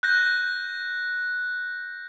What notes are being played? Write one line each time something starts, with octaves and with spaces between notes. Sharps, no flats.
F#6 G6 A#6